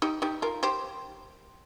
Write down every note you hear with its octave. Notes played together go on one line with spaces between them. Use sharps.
D#4 G4
D#4 G4
F4 A#4
G4 C5